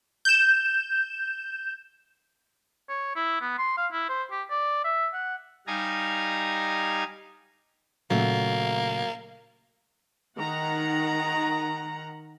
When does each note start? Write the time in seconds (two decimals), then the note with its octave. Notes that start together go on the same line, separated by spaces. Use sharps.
0.25 G6 E7
2.89 C#5
3.16 E4
3.41 B3
3.58 C6
3.77 F5
3.92 E4
4.09 C5
4.31 G4
4.50 D5
4.85 E5
5.14 F#5
5.67 G3 D#4 F5 G#5 A#5
8.10 A#2 C#3 F#3 A3 A#3
10.37 D#3 F#5 A#5